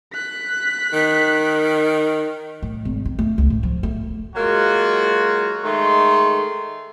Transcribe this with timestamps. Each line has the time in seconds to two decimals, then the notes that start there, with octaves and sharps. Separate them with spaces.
0.14 F#6 B6
0.93 D#3
2.63 A2
2.85 G#1
3.05 D#3
3.19 A3
3.38 C#2
3.50 A2
3.63 F3
3.83 A3
4.36 F#3 G#3 A#3 F4 F#4
5.64 D#3 G#3 A3 C6